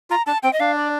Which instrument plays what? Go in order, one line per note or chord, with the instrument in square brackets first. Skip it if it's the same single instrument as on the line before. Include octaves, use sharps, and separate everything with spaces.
[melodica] F4 [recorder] A#5
[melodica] D4 [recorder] A5
[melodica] C4 [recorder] G5
[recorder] D#5
[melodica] D4 [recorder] F5
[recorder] D5